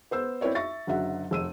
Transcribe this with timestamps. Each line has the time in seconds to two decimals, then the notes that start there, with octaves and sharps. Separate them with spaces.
0.11 B3 C5 E6
0.41 C4 E4 B4 C#5 D5
0.55 E5 C#6 A6 A#6
0.87 F#1 D3 F#3 E5 F#5
1.31 F1 E6 D#7